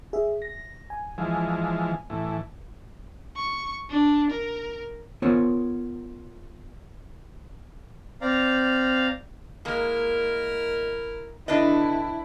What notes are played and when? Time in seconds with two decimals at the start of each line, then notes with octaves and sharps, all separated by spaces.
0.13 G#4 E5
0.42 A#6
0.90 G#5
1.18 E3 F3 G#3
2.10 A2 E3
3.37 C#6
3.90 D4
4.30 A#4
5.22 B3 F4 A#4 C5 C#5
8.21 C4 D5 F5 A#5
9.65 G#3 A#3 E4 A#4
11.48 D3 D4 E4 B4 D#5